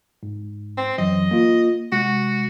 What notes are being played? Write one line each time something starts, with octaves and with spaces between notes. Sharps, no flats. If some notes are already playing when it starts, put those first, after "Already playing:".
G#2
C4
F#2 E3 F#3 D#5
A#3 F4
C3 G#3 F#4